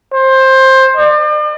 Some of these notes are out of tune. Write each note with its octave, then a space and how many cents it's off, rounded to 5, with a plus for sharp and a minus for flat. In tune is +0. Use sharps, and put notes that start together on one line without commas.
C5 +15
D5 +40